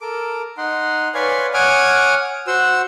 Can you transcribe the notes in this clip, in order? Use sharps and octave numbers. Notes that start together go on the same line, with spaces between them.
A4 A#4 D6
D#4 F#5 C6
B4 C#5 D5 F5 G#5 C6
C#5 F#5 G#5 D6 D#6 F6
F#4 C5 F#5 E6